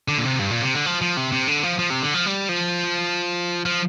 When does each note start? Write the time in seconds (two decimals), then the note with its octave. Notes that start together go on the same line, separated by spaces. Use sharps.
0.08 D3
0.18 A#2
0.24 C3
0.39 G2
0.51 A#2
0.62 C3
0.74 D3
0.86 F3
1.01 F3
1.17 C3
1.32 C3
1.48 D3
1.63 F3
1.79 F3
1.90 C3
2.02 D3
2.14 F3
2.26 G3
2.49 F3
3.65 F3